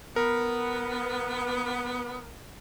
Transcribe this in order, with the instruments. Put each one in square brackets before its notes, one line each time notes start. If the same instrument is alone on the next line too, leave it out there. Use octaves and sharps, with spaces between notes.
[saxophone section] B3 [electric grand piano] A#4